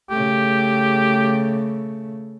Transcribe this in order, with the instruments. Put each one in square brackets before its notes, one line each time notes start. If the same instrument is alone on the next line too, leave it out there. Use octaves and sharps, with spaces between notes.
[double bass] C#3 A3 [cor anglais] G4